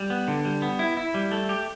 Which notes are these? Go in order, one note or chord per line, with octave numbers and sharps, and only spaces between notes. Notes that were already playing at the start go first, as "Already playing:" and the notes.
Already playing: G3
B3
D3
G3
B3
E4
E4
G3
A3
G4